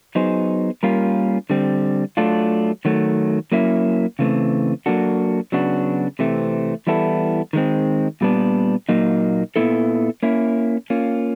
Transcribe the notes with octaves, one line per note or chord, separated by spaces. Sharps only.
F#3 B3 D#4 G#4 C5
G3 A#3 C#4 F4 A#4
D3 G3 C4
F#3 A3 D4 F4
D#3 F#3 A3
F#3 A#3 C#4 E4
C#3 E3 A3 C4
F#3 A#3 D4 F#4 A4
C#3 F#3 B3 D4 F#4
C3 E3 A3 C4
E3 G3 B3 E4 A4
D#3 G#3 C4
A#2 G3 B3 D4
A#2 F#3 A#3 D#4
A#2 G3 B3 E4 A4
A#3 C#4 E4
A#3 C#4 F4